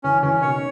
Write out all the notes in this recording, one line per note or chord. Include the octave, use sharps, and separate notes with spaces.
C#3 E3 C#4
C#3 E3 C#4
B2 D#3 C#5